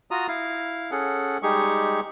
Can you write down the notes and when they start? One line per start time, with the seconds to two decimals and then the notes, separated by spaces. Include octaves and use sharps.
0.11 F4 F#4 A#5 D#6
0.28 E4 F5
0.91 C#4 G#4 A4 F#5
1.43 G3 G#3 D#4 G4 G#4 C#6